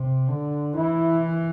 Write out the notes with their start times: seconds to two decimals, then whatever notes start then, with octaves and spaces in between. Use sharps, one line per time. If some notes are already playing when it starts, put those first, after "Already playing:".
Already playing: C3
0.28 D3
0.76 E3 E4